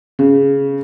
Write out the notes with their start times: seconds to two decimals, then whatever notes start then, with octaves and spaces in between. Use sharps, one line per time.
0.19 C#3